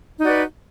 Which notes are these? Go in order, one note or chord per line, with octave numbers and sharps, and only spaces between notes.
D#4 F#4 B4 D5